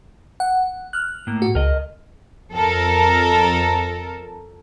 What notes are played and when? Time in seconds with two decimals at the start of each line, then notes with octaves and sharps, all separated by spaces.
0.40 F#5
0.93 F6 F#6
1.27 A2 A#3
1.42 F#4
1.55 C#2 A#4 D#5
2.53 F2 A4 A#4